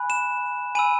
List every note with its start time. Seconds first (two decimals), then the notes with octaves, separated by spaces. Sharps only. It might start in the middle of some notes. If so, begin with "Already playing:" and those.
Already playing: G#5 B5 F#6
0.10 E7
0.75 G#5 B5 E6 D#7